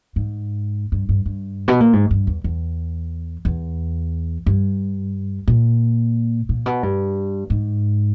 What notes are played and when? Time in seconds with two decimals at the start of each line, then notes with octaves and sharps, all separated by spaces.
0.16 G#2
0.92 G2
1.09 G2
1.26 G2
1.68 B2
1.80 A#2
1.93 G#2
2.11 G2
2.27 E2
2.44 E2
3.45 E2
4.46 G2
5.48 A#2
6.49 A#2
6.66 B2
6.83 G2
7.50 G#2